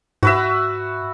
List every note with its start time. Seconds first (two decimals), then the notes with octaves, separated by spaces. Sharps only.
0.23 G#2 F#4 B4 E5